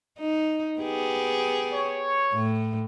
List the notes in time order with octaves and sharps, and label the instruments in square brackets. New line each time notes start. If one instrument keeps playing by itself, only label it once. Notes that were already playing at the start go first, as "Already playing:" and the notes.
[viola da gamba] D#4
B3 G4 G#4
[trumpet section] C#5
[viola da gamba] A2